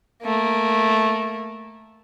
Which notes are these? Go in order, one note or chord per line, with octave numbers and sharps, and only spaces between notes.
A3 A#3